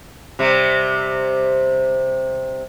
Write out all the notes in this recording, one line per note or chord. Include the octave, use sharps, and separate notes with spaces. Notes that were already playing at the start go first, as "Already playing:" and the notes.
C3 G3